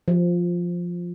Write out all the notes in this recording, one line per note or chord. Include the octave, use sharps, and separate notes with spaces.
F3